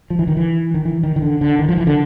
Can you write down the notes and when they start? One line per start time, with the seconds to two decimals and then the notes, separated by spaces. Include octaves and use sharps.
0.10 F3
0.19 E3
0.28 D#3
0.37 E3
0.74 D#3
0.85 E3
1.03 D#3
1.16 D#3
1.22 D3
1.41 D3
1.59 D#3
1.69 F3
1.78 E3
1.87 D3